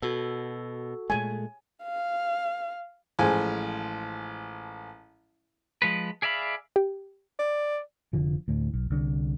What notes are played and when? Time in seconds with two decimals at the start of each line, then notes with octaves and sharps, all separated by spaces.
0.02 B2 F#4 A4
1.10 A#2 G#3 A3 G#5
1.83 F5
3.19 A1 F3 G#3 G#5
5.82 F3 G#3 B4
6.22 G#4 D5 E5 F5 B5
6.76 G4
7.39 D5
8.13 F1 D3 F3
8.48 D2 A2
8.74 B1
8.90 C2 D3